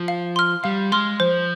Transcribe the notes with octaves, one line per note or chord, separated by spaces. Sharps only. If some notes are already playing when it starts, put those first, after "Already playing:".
Already playing: F3
F5
C6 F6
G3 F5
G#3 C6 F6
F3 C5